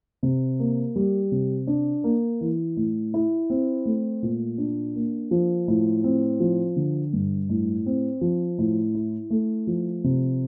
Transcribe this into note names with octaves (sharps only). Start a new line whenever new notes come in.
C3
A#3
G3
C3
D4
A#3
E3
A2
E4
C4
A3
A#2
D4
A#3
F3
A2
C4
F3
D3
G2
A2
C4
F3
A2
E4
A3
F3
C3